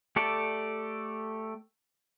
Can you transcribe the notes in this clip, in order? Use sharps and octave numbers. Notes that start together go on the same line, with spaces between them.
A3 G4 A4 D5